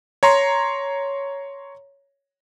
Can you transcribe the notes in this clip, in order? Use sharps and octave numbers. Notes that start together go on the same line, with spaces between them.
C#5 A#5 C6